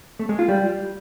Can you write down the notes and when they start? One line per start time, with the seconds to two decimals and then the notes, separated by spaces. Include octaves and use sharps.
0.19 A3
0.29 G#3
0.39 F4
0.48 G3